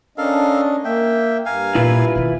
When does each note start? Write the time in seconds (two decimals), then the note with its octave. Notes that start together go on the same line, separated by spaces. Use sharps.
0.18 C#4 D4 A4 A#4 D#5 F5
0.85 A#3 E5 G5
1.46 G2 A#4 F5 G#5
1.75 A#2 E4 F4 B4
2.15 B2 D#3